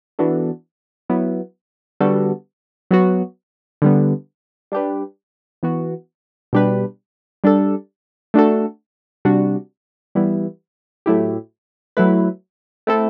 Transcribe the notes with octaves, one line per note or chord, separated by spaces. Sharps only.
E3 B3 D4 F#4 A4
F#3 B3 E4
D3 G3 B3 F#4 A4
F#3 B3 F#4
D3 G3 B3
G3 D4 G4 B4
E3 B3 F#4
B2 G3 D4 G4 B4
G3 D4 A4
A3 D4 F#4 A4
C3 G3 D4 F#4
E3 G3 B3 E4
A2 F#3 A3 E4 G4
F#3 A3 E4 B4
A3 C4 E4 A4